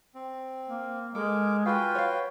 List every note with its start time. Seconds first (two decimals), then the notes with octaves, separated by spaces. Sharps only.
0.15 C4
0.70 A#3
1.15 G#3 A4 A#4 D6
1.66 F4 F#4 G#4 B4 F5 G5
1.95 C#5 F5